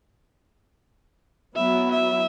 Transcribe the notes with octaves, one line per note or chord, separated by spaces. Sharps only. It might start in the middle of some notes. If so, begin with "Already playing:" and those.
F#3 B3 E4 E5
E5